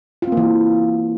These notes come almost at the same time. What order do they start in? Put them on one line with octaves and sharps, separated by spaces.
F4 C4 A#3 E3 F#4